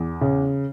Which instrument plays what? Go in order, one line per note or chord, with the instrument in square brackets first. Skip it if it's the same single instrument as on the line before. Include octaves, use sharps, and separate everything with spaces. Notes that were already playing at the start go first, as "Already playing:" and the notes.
Already playing: [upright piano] E2
C#3